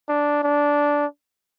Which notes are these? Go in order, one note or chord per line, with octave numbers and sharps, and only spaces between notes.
D4
D4